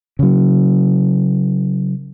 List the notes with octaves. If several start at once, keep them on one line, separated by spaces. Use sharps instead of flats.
C#3 F#3